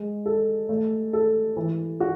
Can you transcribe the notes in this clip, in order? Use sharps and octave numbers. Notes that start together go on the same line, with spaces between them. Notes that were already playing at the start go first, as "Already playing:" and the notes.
Already playing: G#3
A4
A3
A4
E3
F#4